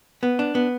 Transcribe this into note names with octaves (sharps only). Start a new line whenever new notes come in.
B3
D4
B3